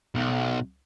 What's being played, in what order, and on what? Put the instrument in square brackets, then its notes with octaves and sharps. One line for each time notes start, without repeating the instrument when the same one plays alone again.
[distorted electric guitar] B1